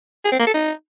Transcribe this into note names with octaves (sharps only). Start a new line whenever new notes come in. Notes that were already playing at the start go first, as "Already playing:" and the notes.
G#4
C4
A#3
A4
D#4